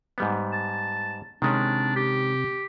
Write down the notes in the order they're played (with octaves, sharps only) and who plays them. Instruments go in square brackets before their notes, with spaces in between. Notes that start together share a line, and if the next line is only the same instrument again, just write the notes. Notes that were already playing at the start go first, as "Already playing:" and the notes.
[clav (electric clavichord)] G#2 G3 B3
[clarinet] A5
[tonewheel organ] C3 [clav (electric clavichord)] D#3 G#3 C#4 [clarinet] D4
[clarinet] G4